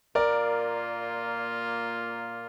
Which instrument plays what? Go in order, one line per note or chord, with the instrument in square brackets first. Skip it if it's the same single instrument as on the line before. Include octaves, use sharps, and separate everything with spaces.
[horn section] A#2 A#3 F4 [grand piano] A#4 D5